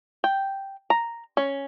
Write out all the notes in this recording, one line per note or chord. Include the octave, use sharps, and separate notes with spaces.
G5
A#5
C#4